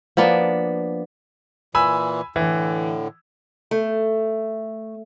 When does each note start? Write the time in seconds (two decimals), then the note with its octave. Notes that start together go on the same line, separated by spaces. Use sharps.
0.17 F3 A#3 B3 D4
1.75 A#2 E3 G#5 B5 E6
2.36 A2 D3 E3
3.71 A3